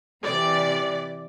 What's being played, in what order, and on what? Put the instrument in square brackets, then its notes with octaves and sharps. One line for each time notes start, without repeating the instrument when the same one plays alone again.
[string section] C3 E3 [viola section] D5